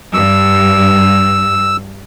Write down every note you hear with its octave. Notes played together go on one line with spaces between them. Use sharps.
G2 E6